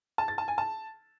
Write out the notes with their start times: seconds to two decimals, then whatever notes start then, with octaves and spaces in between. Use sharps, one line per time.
0.18 A5
0.28 A6
0.38 A5
0.48 G#5
0.58 A5